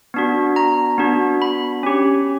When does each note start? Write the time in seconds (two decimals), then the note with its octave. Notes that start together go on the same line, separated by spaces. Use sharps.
0.14 B3 D4 F#4
0.56 A#5
0.98 B3 D4 F#4
1.42 B5
1.83 C#4 G4